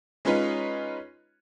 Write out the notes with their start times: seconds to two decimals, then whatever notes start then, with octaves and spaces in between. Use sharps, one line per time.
0.25 G#3 C#4 D#4 F4 B4 C#5